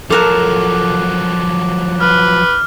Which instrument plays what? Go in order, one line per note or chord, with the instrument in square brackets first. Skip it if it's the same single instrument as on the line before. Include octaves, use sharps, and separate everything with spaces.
[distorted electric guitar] F3 F#3 [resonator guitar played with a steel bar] A4 A#4 A5 [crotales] D6 F#6
[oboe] B4 [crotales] F6